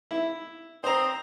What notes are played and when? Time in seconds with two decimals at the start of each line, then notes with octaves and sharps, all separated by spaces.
0.11 E4
0.84 C4 C5 A#5 D#6